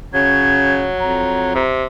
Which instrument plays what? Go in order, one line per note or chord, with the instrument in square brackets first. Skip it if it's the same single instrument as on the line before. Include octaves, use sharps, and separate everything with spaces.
[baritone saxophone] C#3 [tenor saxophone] F#3 [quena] G#6
[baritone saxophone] F2 [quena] A#5
[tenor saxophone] C3